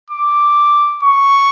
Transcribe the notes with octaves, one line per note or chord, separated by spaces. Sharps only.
D6
C#6